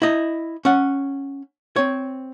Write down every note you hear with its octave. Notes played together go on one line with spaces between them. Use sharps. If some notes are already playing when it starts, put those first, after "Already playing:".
E4 D#5
C#4 F#5
C4 C#5